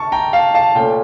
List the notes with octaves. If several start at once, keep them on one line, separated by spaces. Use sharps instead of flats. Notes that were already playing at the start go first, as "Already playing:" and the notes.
Already playing: A5 C#6
G5 A#5
F5 A5
F5 A5
A#2 A3 C#4 G5